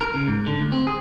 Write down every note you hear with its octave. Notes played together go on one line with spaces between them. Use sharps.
A#4
C#3
G#2
D3
D2
C4
G#4